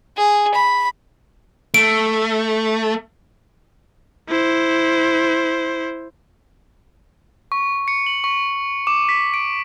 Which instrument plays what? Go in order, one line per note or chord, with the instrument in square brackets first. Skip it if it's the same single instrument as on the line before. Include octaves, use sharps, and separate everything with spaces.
[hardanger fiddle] G#4
B5
[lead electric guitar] A3 [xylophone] D7
[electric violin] E4 C5
[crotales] C#6
C#7
F#7
C#6
D6
B6
D7